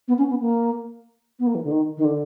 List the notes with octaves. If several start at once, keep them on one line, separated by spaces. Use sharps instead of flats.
B3
C#4
B3
A#3
B3
A#3
E3
D3
D#3
D#3
D3